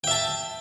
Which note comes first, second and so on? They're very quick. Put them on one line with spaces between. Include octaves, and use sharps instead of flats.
G5 E5 A5